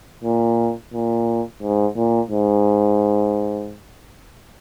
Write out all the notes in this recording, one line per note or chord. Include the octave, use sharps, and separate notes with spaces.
A#2
A#2
G#2
A#2
G#2